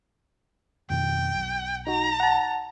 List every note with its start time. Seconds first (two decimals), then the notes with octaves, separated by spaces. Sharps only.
0.90 F2 B2 D#3 G5
1.34 B1
1.87 D#4 F#4 A#5
2.20 F#5 A5